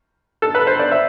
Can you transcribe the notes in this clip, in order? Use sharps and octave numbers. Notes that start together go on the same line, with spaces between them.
A4
B4
C5
D5
E5